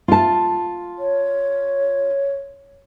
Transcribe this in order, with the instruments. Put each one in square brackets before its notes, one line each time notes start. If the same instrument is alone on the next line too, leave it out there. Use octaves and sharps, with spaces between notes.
[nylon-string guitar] F4 A5
[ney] C#5